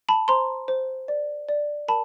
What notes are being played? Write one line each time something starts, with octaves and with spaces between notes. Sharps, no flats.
A5 B5
C5 A#5 C6
C5
D5
D5
A#4 A5 B5